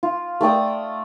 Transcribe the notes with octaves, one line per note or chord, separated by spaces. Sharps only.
F4
A3 D5 G5 D#6